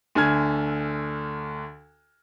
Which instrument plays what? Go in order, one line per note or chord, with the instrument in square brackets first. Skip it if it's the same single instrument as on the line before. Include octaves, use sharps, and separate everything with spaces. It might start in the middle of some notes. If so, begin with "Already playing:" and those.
[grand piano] D2 D3 G#5 F6 G#6